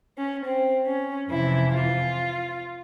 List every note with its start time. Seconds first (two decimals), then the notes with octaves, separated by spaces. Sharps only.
0.18 C#4
0.45 C4
0.87 C#4
1.29 F2 C3 E3 E4
1.72 F4